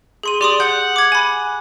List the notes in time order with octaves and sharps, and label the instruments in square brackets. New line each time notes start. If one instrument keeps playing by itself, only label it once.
[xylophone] G#4 C6 D#7
[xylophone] G4 C6 D#6 [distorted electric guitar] D5
[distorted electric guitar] F#5 [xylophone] G6
[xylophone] D6 G#6
G#5 B5